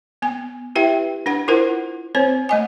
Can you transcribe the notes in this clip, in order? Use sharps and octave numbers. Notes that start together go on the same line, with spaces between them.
B3 G#5
E4 G4 B4 E5 G5
D4 B4 F#5
E4 F4 A#4 C5 F#5
C4 C5 C#5
A3 D#5 G#5